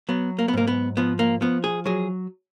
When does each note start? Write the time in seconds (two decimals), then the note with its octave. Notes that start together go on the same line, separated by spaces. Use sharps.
0.09 F#3 B3
0.39 A#3
0.48 B3
0.53 G#2 A#3
0.67 B3
0.97 F3 B3
1.19 A#3
1.41 F3 B3
1.64 G#4
1.86 F#3 G#4